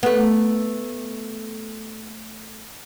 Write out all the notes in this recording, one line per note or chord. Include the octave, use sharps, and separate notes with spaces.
A3 B3